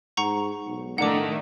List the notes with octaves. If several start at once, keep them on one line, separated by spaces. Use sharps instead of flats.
G#2 F#5 A#5 C#6
B1
A2 D#3 A3 A#3 D4 F#5 D6